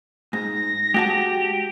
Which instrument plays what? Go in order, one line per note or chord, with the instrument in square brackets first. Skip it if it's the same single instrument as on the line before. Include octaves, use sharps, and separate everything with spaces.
[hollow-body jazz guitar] G#2 [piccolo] A#6
[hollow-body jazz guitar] G#3 F#4 A5 [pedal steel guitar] G4